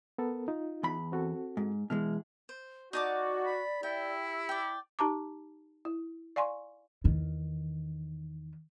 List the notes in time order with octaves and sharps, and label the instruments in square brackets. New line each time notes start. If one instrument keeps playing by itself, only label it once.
[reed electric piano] B3 A4 A#4
D#4 F4
[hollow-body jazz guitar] E2 B5
[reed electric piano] C4 F#4 A4
[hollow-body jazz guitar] G#2
[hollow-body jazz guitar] B2 E3 G#3 [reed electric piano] F6
[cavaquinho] C5
[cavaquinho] D#4 A5 D6 [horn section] F#4 [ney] D5
[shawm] B5
[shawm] E4 [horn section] G4 E5 [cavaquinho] G5
[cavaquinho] D5 G5
[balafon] D#4 G4 A5 A#5 D6
E4
D5 F5 G#5 C6 C#6
[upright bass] E2 D#3